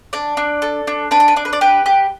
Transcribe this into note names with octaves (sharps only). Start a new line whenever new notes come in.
D4 D5
D4
A4
D4
D4 B4
D5
B4
D4 D5
B4
D5
G4 B4
G4